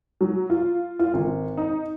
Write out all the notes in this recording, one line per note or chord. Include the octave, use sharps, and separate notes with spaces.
F#3
F4
F4
G#1
D#4